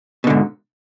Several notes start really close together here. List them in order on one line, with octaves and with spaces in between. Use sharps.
B2 D3 G#2